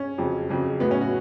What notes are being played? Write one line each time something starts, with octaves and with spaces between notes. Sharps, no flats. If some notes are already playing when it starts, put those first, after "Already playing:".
Already playing: C#4
F2 C#3 F#3
F2 C#3 F#3
A2 F#3 B3
C#4
F#4